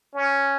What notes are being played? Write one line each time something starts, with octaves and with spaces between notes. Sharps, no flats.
C#4